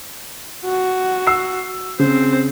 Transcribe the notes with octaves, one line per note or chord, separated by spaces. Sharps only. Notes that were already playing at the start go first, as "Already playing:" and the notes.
F#4
E6 C7
C#3 C4 C5